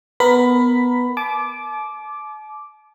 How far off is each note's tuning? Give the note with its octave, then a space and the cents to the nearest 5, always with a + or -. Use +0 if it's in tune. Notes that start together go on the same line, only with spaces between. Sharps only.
B3 +0 A#4 +15 B5 +10
A5 -45 D6 +0